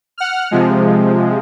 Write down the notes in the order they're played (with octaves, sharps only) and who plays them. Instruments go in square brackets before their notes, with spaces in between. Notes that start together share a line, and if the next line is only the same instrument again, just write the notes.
[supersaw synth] F#5 F6
C3 F3 G#3